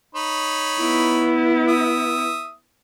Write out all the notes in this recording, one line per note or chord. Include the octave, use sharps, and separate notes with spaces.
D#4 C#5 B5
B3 E4
E5 D#6